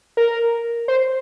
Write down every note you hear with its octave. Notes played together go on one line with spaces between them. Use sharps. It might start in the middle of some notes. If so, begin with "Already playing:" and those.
A#4
C5